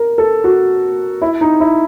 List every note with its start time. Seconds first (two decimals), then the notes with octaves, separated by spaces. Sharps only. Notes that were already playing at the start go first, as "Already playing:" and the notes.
Already playing: A#4
0.18 A4
0.44 F#4
1.22 E4
1.41 D#4
1.60 E4